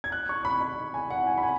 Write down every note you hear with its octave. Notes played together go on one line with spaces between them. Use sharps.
G#6
F#6
C#6
B5
B5
G#5
F#5
G#5
B5
G#5